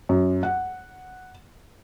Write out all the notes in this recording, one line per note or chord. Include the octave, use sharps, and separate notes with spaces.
F#2
F#5